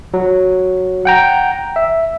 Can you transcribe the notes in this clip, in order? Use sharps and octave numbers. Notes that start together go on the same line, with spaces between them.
F#3
F#5 G5 A#5
E5